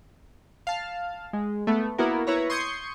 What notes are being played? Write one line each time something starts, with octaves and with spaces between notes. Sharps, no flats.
F5 A5
G#3
A3 B3
A#3 B3 E4 F#4 A#4
E4 B4 C#5 A#5
C6 C#6 D#6 G6 G#6 C#7